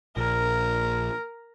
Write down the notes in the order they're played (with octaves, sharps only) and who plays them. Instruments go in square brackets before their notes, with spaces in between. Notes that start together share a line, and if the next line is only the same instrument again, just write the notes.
[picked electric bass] A#1 [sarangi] A#4